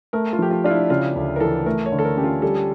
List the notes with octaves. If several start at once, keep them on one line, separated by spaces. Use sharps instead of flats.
A3 A#4
F4
F3 G4
F4
D4 F4
E4
C#3 F4
D2
A#4
E3 A4
A3 A#4
C#5
D3
A4
A#4
C#4 G4
F4
G3 A4